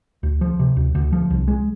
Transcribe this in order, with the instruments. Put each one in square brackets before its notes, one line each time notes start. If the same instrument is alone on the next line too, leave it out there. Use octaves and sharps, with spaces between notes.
[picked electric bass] D2
F3
C3
D2
D2
F3
C2
G#3